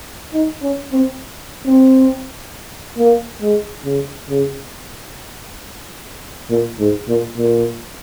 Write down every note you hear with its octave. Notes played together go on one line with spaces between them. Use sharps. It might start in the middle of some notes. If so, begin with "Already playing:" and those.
D#4
C#4
C4
C4
A#3
G#3
C#3
C#3
A#2
G#2
A#2
A#2